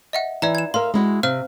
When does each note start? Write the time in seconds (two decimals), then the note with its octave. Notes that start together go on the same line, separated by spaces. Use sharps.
0.13 D#5 E5 F#5
0.42 E3 D5 E5 A#5
0.55 G#6 E7
0.74 A#4 E5 F5 C6
0.94 G#3 E4 F#4
1.23 C3 C5 F5 F6